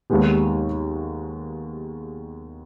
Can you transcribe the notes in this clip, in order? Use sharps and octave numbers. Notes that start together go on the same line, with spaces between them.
D#2 D#3 G#3 B3 G4